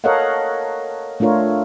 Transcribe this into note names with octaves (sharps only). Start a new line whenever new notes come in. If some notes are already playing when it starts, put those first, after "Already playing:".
A4 A#4 C#5 D#5 F5 F#5
A3 D4 F4 A#4 C#5